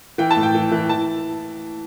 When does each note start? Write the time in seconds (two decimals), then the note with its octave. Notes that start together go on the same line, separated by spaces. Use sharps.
0.18 E3 G5
0.31 A5
0.36 A2
0.43 G5
0.55 E3
0.72 E3
0.89 E3 A5